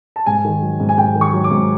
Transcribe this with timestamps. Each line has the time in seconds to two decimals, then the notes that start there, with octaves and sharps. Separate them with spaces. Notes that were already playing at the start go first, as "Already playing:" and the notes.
0.16 A5
0.26 G#2 G#5
0.44 D#3
0.62 F#3
0.80 G#2
0.89 G#5
0.97 G#2 G5
1.15 D#3
1.21 C#6
1.33 F#3
1.44 D6
1.51 G#2